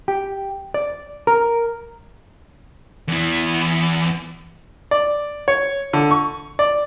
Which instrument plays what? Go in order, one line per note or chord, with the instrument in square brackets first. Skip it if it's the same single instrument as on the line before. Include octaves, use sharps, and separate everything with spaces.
[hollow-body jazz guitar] G4
D5
A#4
[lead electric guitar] E2 E3
[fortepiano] D5
C#5
D3
C#6
D5